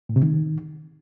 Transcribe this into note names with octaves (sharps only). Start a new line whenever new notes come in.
A2
C3
D#3